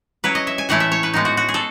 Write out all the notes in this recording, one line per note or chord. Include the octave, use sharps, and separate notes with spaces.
F#3 C#4 E4 B4
D#5
E5
G#5
A2 E3 A3 E4 F#5
E5
C#5
B4
A2 G#3 B3 D#4
F#4
F#4
G#4
A4